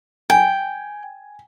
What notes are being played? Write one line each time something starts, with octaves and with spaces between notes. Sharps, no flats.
G5 G#5